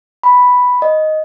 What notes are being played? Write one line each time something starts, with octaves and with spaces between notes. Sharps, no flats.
B5
D#5